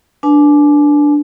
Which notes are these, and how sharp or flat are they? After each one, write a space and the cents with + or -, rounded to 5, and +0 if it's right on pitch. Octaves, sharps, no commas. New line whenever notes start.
D4 +0 B4 +0 G#5 +40